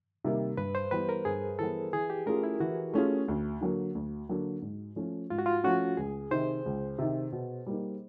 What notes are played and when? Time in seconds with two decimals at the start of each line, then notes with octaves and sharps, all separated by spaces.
0.24 C3 D#3 G3 A#3
0.57 G2 B4
0.75 C5
0.91 E3 G3 B3 B4
1.09 A#4
1.25 G2 G#4
1.59 E3 G3 B3 A4
1.93 E3 G#4
2.10 G4
2.26 A3 C#4 F4 G#4 A#4
2.43 E4
2.60 E3 F#4
2.94 A3 C#4 F4 G#4
3.28 D2
3.61 D3 F#3 A#3
3.95 D2
4.29 D3 F#3 A#3
4.62 G#2
4.96 F3 A3 C#4
5.30 G#2 F4
5.39 F#4
5.46 F4
5.64 F3 A3 C#4 F#4
5.97 C#2 G#4
6.31 C3 D#3 C5
6.66 C#2
6.98 C3 D#3
7.32 B2
7.66 G3 A#3 D#4